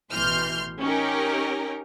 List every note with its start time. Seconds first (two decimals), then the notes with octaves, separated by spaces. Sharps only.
0.12 A1 B2 E3 C6 F6 G6
0.81 C#4 D#4 G4 A#4